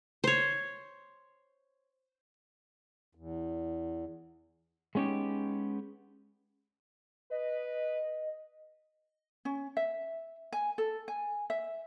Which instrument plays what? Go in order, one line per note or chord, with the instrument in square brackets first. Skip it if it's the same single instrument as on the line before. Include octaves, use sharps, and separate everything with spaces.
[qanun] C5 C#5
[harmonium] E2
[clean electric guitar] G#3 B3 C#4 D#4 G4
[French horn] B4 [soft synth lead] D#5
[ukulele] C#4
E5
G#5
A4
G#5
E5